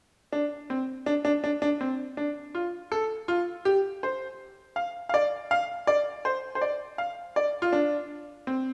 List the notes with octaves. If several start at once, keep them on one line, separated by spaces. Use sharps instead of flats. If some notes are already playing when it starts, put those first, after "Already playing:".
D4
C4
D4
D4
D4
D4
C4
D4
F4
A4
F4
G4
C5
F5
F5
D5
F5
D5
C5
C5
D5
F5
D5
F4
D4
C4